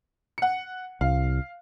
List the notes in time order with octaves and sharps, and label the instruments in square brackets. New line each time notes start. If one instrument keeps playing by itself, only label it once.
[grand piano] F#5 C#7
[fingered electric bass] C2 [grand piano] F5